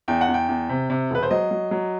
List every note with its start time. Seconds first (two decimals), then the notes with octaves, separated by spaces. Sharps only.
0.08 E2 G5
0.21 F#5
0.28 E2
0.34 G5
0.49 E2
0.69 C3
0.90 C3
1.10 E1 B4
1.23 C5
1.31 F#3 D#5
1.51 F#3
1.71 F#3